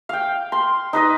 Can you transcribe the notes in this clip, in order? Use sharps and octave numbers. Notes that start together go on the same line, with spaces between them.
F5 G5
C6
D#4 B4 D#5